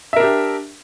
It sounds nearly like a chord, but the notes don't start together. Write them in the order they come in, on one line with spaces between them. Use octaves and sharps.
E5 A#4 D4 G4